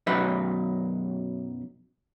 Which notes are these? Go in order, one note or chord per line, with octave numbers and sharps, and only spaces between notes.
B1 F#2 D#4 B4 E5